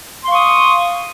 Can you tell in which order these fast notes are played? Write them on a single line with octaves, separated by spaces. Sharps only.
C6 F5 C#6 D#6